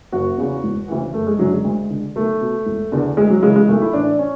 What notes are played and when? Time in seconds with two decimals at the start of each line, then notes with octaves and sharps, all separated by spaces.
0.12 F#1 F#4
0.38 E2 C#3
0.64 E1
0.88 D2 C#3 E3
1.14 F#1 A3
1.27 G#3
1.39 F#2 D3 F#3
1.52 G#3
1.64 D2
1.90 D3
2.16 B1 A3
2.41 B2
2.66 E1
2.92 E2 D3
3.17 D2 G#3
3.30 F#3
3.42 C#3 G#3
3.47 E3
3.56 G#3
3.68 B1 A3
3.82 E4
3.93 A2 E3 D4
4.19 C#4